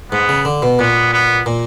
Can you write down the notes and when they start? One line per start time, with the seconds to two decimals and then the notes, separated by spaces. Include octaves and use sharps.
0.12 G#2 B3
0.29 C#3
0.45 D3
0.62 B2
0.79 A#2 B3
1.13 B3
1.46 A#2